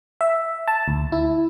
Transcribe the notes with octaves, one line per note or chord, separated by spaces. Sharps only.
E5
A5
D2
E4